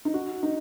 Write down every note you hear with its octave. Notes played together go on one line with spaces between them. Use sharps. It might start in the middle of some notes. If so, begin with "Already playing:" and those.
D#4
F#4
D#4